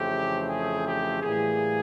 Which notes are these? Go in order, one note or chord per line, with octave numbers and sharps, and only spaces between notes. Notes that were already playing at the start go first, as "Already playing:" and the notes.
Already playing: F2 C#3 E3 A3 C4 G4
G#4
G4
A2 E3 G3 A#3 G#4